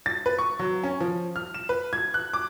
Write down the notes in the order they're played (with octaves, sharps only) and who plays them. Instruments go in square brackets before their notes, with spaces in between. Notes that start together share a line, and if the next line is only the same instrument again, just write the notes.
[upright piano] A6
B4
C#6
F#3
C#4
F3
F6
E7
B4
G#6
F#6
D6